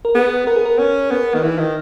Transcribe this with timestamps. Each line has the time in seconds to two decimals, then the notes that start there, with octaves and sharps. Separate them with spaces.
0.05 A#4
0.15 B3 G#4
0.46 B3 A#4
0.56 G#4
0.66 A#4
0.79 C#4
1.11 B3
1.34 D#3
1.43 E3 D#4
1.59 D#3